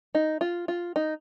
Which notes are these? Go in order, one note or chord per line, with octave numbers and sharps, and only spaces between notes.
D#4
F4
F4
D#4